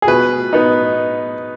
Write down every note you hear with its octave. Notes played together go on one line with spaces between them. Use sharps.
G#4
B2 B4
B3 D#4